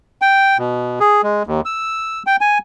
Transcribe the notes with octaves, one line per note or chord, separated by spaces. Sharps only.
G5
B2
G#4
G#3
D#2
E6
G5
G#5